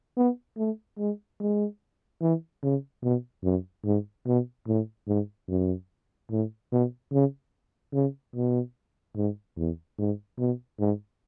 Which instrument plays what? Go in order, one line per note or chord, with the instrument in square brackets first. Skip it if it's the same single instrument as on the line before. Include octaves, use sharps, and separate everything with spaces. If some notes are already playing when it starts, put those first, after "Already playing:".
[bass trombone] B3
A3
G#3
G#3
E3
C#3
B2
F#2
G#2
B2
A2
G#2
F#2
A2
B2
C#3
C#3
B2
G#2
E2
G#2
B2
G#2